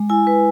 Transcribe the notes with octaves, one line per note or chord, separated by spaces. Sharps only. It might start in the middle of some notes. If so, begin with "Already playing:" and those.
Already playing: G#3
E4 G#5
B4